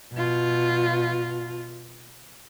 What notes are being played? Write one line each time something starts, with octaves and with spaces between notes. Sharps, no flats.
B2 F4